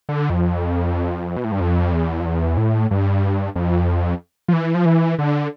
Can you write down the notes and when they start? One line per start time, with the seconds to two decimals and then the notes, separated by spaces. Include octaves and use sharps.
0.09 D3
0.30 F2
1.37 B2
1.44 A2
1.52 G2
1.60 F2
1.93 E2
2.20 F2
2.25 E2
2.57 A2
2.91 G2
3.56 F2
4.48 F3
4.53 E3
4.74 F3
4.85 E3
5.19 D3